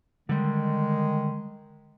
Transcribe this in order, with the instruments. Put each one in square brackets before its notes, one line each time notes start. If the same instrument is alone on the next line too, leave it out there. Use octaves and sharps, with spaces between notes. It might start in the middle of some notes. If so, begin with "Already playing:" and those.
[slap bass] D3 G3 [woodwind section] D#3 G#3